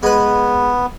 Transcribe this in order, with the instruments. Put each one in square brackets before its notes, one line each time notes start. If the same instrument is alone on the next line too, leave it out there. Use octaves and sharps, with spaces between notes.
[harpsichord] G#3 B4 [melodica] B3